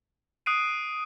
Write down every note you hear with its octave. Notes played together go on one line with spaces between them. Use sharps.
D#6 F#6 C7 D7 D#7